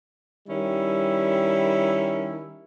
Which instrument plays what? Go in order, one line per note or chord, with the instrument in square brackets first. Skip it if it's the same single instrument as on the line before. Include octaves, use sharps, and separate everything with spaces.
[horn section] D#3 G3 C#4 E4